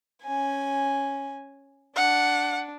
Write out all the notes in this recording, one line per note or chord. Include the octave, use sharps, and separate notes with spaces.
C#4 G#5
D4 F#5